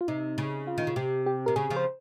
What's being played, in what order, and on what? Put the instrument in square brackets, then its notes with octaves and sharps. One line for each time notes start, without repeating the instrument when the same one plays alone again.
[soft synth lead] F4
[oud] C3 [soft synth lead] D#4
[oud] C#3
[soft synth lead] F4
[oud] D#3
C#3
[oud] C3 [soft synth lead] G4
[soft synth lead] G4
[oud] C3 [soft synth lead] A#4
[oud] C#3 [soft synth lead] G#4
[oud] C#3 F3
[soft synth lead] C5